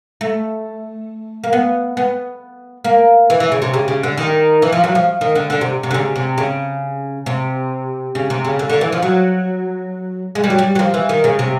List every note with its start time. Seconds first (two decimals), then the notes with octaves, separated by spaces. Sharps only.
0.21 A3
1.44 A#3
1.53 B3
1.97 B3
2.84 A#3
3.30 E3
3.40 E3
3.52 C#3
3.62 C3
3.74 C#3
3.88 C#3
4.03 D3
4.17 D#3
4.62 E3
4.72 F3
4.84 F#3
4.95 F3
5.21 D#3
5.35 D3
5.50 D3
5.61 C3
5.83 C3
5.91 D3
5.94 C#3
6.16 C3
6.38 C#3
7.26 C3
8.15 C#3
8.30 C3
8.45 C#3
8.59 D3
8.69 D3
8.81 E3
8.92 F3
9.02 F#3
10.35 G#3
10.44 G3
10.50 F#3
10.58 G3
10.75 F#3
10.79 F3
10.94 E3
11.09 D#3
11.24 C#3
11.39 C3